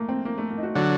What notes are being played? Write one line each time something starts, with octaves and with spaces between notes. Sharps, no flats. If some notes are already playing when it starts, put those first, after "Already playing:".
Already playing: A3 A#3
C4
A#3
A3
A#3
D#4
F#4
D3 F#3 F#4